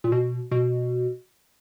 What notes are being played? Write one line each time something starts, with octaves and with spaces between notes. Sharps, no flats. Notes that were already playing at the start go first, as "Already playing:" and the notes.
A#2
B2
B2